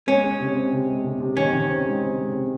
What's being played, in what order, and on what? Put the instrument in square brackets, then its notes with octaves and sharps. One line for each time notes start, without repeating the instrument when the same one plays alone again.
[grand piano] G#3 [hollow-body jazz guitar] C#4
[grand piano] G#3
C3
C4
C3
G#3
C3
C3
[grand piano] D#3 [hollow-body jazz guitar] C#4
[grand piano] D#3
C4
G#3
C4
G#3
C3